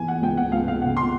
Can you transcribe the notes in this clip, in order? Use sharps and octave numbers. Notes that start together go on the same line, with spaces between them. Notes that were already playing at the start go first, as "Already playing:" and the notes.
Already playing: E3 G#5
F#5
C#2 G5
F#5
C#2 F5
F5
C#3 F#5
C6